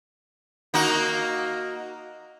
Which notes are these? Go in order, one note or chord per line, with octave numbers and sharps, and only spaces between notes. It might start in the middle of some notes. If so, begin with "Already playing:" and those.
A#3 D#4 F#4